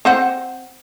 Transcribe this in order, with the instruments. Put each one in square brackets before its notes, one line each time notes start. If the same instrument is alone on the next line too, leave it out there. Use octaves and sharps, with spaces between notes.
[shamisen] C4 C5 F#5